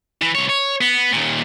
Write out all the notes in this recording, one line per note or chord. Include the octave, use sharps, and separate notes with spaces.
E3
C2 C#5
C#5
B3
D#2 A#2